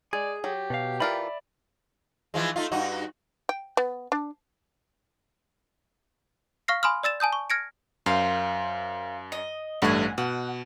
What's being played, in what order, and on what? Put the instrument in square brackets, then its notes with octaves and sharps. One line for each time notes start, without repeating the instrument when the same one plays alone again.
[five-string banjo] G#3 [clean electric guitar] G#4 [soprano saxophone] D5
[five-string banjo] F#3 [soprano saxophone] G4
[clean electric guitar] B2 F5
[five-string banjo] E3 F4 A#4 [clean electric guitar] D5 E5 B5
[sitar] E3 F3 G#3
A3 D#4 F4
G2 D#4 F#4
[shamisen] G5
B3
D4
[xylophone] F5 C#6 F6 A#6 C7
G#5 B5 C6 D#6 F6
D5 E6 A6 E7
G#5 A5 D#6 G6
C#6
F6 G#6 A#6 C#7 D7
[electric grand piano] F#2 [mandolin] F4 A#4 C5
[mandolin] D#5
[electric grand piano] A1 G2 A3 [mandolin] F#5 G#5
[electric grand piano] B2 [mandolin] F#5